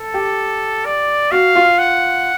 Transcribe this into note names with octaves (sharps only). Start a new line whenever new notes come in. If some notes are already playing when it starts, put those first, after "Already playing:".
Already playing: A4
G4
D5
F#4 F5
F4
F#5